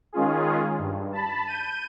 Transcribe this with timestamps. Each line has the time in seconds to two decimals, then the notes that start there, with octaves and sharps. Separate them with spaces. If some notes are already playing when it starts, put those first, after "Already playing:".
0.13 D#3 G#3 C#4 F4 G#4
0.79 G2
1.13 A5 B5
1.47 G6 D#7